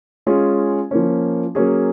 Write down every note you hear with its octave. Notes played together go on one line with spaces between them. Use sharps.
G#3 C#4 F4 G#4
F3 A#3 C#4
F#3 A#3 C#4 G#4